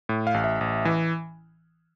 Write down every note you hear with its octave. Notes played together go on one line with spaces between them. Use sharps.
A2
F5
A1
E5
A1
E3